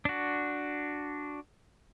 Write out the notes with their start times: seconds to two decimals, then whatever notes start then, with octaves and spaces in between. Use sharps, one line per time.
0.05 D4 F#4